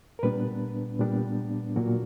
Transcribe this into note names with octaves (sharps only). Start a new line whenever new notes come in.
A#4
A#2 G3 B3 D4 B4
A#2 G3 B3 D4
A#2 F#3 A#3 F#4